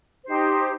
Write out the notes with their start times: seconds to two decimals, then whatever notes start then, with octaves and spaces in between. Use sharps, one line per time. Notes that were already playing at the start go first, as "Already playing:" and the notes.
0.25 D#4 G4 C5